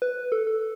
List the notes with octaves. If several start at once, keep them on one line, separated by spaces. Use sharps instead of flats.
B4
A4
A4